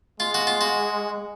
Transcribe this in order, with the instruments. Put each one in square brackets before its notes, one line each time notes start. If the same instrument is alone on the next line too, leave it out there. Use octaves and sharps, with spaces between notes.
[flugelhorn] G#3 [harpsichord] F4
[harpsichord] F#4
F4
F#4